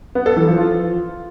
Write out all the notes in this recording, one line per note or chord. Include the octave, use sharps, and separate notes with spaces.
B3
A4
E3
F3
F4